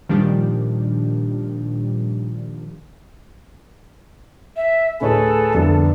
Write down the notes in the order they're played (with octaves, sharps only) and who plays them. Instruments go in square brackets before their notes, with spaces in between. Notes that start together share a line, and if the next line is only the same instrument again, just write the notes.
[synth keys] A#2 D#3 F3 G3 D4 G4
[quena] E5
[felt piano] D2 A2 C#5 [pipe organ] G#4 B4 [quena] A4
[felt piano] C2 [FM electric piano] F2 [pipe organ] D3 B3 D4